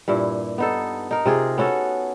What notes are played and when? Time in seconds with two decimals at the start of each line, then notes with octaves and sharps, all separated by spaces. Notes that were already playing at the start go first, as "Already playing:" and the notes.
0.08 G2 A#2 E4
0.58 B3 D#4 A4
1.11 D#4 A#4
1.26 C3 F4 G#4
1.58 B3 C#4 F#4 A4